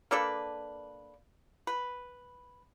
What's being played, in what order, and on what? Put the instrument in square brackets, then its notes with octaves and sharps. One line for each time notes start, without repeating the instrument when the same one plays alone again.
[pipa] A#3 D4 A4 B4
B4